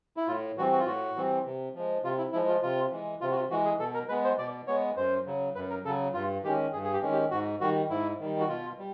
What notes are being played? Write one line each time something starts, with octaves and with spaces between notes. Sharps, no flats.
E4
A2 F4
E3 G3 C4 F#4
F#4
F4
A2 F#4
E3 G3 C4
C3
F3 G#3
C3 F4
E4
F3 G#3 E4
F4
C3 F4
E3 G#3
C3 F4
F#4
F4
E3 G#3 F#4
G#4
B2 A4
A#4
G#3 B3 B4
C5
B2 D5
G#3 B3 C#5
F#2 C5
C#3 F#3
F#2 B4
A#4
C#3 F#3 A4
G2 F4
D#3 G#3 C#4 G4
G2 G#4
G#4
G4
D#3 G#3 C#4
G4
G#2 F#4
D#3 G3 F#4
G#2 E4
D#3 G3
F#4
B2 F4
G3